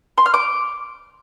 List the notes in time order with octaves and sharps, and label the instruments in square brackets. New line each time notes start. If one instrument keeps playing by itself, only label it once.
[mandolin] C6
F6
D6